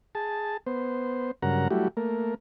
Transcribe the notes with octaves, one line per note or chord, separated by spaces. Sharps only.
G#4 A5
B3 C5
G2 C#3 F#3 A#4 F#5 A#5
F#3 G3 A3 E4 F#4 G4
A3 A#3 A#4